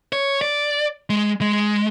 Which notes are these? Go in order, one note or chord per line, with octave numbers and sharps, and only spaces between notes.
C#5
D5
G#3
G#3